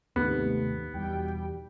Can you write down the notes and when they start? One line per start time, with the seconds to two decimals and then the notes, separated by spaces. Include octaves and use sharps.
0.16 D#2 G#2 C3 A3 B3 D#4 G4
0.94 E2 B2 G3 G5